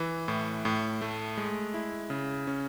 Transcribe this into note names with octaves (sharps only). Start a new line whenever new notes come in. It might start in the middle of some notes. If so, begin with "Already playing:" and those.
Already playing: E3
A2
A2
A3
G#3
E4
C#3
C#4